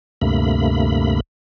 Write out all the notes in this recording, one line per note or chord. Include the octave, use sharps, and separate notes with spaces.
D2 G2 C3 A3 A#3 B5